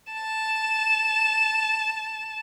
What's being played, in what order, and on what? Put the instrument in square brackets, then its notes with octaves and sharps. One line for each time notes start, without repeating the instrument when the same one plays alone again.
[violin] A5 E7